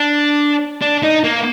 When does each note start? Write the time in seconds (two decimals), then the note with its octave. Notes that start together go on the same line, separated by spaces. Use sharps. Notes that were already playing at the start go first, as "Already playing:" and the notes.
Already playing: D4
0.81 D4
1.03 D#4
1.24 A#3